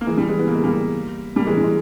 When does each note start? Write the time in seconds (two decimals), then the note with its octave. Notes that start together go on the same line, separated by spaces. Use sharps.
0.01 A#3
0.07 E3 G#3
0.17 G3
0.29 E3 G#3
0.39 B3
0.47 A#3
0.55 G#3
0.64 G3 A#3
1.36 G3 A#3
1.47 E3 G#3
1.57 G3
1.64 G#3